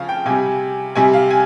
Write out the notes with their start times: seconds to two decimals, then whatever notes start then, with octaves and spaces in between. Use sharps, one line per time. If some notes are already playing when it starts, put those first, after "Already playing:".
Already playing: C#3 F3 F5
0.09 G5
0.26 C3 G3 G#5
0.95 C3 G3 G#5
1.13 F5
1.31 G#5